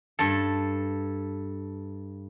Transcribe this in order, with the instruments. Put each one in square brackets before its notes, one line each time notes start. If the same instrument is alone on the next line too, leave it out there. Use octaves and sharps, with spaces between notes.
[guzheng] G2 A4